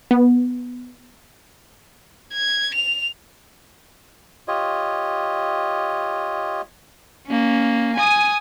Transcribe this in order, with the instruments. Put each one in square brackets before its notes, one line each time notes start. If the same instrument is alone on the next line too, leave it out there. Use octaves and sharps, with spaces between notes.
[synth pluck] B3
[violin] G#6
F7
[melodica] F4 G4 C#5 D#5
[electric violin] A#3 C#4
G#5 D#6